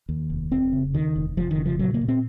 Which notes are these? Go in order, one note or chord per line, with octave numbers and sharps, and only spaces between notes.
D#2
F1
F1 C4
C#3
D#2 D#3
F1
F1 F3
D#3
C#3
F3
A#2 F#3
A#3
A#2
C4